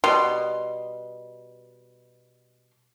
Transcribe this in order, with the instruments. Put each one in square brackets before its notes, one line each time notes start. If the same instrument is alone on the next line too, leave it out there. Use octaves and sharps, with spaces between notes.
[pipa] B2 G3 C6